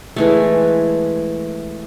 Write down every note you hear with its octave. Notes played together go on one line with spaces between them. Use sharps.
E3 G#3 A3